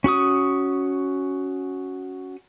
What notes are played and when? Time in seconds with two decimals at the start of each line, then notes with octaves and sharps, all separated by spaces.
0.04 C#4 F#4 C#6 D#6